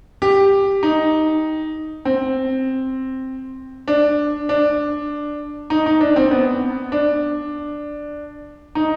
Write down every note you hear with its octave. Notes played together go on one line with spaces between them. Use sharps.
G4
D#4
C4
D4
D4
D#4
D#4
D4
C4
B3
D4
D#4